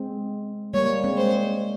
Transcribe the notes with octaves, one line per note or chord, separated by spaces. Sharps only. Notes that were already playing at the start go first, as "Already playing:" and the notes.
Already playing: G#3 C4
G3 A#3 C#5
G#3 C4
C5